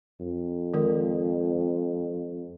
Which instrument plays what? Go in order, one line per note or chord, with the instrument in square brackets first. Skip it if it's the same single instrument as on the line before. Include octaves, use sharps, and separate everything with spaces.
[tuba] F2
[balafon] D#3 G#3 A#4